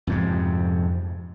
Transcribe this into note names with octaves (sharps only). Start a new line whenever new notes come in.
F2 G#2 C3